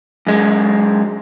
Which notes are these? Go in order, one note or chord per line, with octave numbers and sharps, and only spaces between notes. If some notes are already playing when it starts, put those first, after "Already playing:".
F#2 G#3